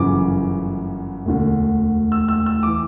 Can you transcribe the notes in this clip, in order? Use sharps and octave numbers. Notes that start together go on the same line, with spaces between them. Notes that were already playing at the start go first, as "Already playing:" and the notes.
Already playing: G1 F#2 C#3 E3 D6
E1 D2 D3
E6
E6
E6
E3 D6